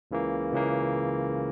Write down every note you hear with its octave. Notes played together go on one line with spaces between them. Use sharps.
C#2 C#3 E3 A#3
C#2 C#3 E3 A#3